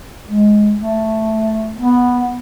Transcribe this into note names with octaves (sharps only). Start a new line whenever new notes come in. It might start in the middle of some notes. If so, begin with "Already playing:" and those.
G#3
A3
B3